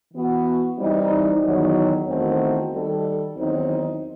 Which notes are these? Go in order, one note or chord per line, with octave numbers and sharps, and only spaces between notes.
E3 B3 F#4
E3 G3 C4 D#4
E2 D#3 F#3
E2 D#3 A3 C4 F#4
D#3 G3 D#4 A4
E2 D#3 F#3 C4 D#4